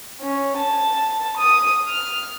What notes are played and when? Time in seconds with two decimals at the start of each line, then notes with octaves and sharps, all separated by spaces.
0.20 C#4
0.58 A5
1.37 D#6
1.89 F6